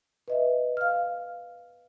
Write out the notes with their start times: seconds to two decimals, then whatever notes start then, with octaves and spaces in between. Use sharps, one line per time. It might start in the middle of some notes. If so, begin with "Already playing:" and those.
0.28 B4 D#5 E5
0.77 F5 F6